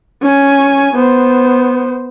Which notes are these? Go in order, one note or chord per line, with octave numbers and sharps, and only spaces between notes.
C#4 G#5
B3 C5